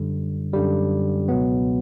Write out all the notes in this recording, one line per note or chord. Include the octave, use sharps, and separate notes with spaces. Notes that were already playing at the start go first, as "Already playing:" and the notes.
Already playing: F#2 D3 G3
F#2 D3 G3
C#2 B2 F#3 B3